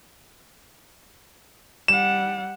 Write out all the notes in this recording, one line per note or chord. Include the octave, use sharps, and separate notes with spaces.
G3 F#5 E7